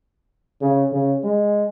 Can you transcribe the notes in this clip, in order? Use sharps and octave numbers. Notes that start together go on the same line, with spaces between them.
C#3
C#3
G#3